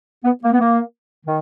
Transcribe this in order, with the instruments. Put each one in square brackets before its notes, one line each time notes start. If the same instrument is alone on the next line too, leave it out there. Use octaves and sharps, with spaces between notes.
[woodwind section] B3
A#3
B3
A#3
D#3